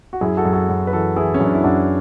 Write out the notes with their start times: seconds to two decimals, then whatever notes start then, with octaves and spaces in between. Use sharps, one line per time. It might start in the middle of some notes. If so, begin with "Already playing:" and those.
0.13 F#4
0.21 F#2 E4 G#4
0.37 F#4 A4
0.45 F#2
0.53 F#4 A4
0.69 F#2
0.87 B4
0.92 E3 F#4 A4
1.16 E3 E4 G#4
1.34 C#4
1.40 F#2 D4
1.54 E4
1.64 F#2 D4 F#4